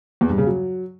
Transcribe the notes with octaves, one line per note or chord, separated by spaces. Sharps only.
E2
G2
C#3
F#3